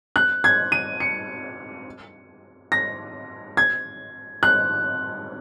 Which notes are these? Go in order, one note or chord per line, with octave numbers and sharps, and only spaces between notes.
F#6
G#6
D#7
C#7
A#6
G#6
F#6